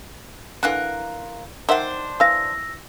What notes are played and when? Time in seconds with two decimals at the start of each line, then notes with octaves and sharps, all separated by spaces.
0.63 D3 E3 F4 A#4 F#6
1.69 D#3 D4 C5 E5 F#5
2.20 E3 F5 E6 A#6